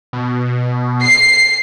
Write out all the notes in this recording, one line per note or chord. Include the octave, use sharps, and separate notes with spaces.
B2
C7